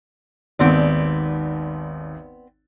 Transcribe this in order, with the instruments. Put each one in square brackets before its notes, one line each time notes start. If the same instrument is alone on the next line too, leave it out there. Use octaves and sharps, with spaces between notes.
[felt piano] G#1 D#2 [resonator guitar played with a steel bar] B3 C4 D5